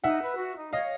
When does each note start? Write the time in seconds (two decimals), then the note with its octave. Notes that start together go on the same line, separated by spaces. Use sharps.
0.04 D#4 E5 F#5
0.21 B4
0.37 F#4
0.56 D#4
0.73 C#5 D#5 F5